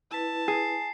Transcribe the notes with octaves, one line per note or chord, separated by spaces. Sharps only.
E4 B4 A5
G#4 C7